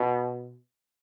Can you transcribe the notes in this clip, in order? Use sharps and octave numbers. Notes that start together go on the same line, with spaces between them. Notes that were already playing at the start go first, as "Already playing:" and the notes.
Already playing: B2